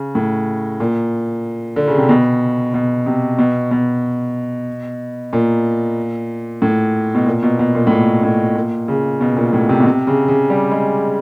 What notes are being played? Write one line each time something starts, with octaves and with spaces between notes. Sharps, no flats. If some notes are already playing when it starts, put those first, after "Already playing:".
Already playing: C#3
A2
A#2
D3
C#3
C3
B2
B2
C3
B2
B2
A#2
A2
B2
A#2
B2
B2
A#2
A2
A#2
A2
A#2
C#3
B2
A#2
A2
C3
B2
C3
C#3
C#3
G3
G#3